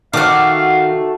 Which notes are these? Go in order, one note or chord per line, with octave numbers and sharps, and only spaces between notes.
D#3 A3 F#4 F5 F#5 D6 F6